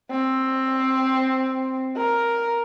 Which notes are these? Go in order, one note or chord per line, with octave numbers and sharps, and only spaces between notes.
C4
A#4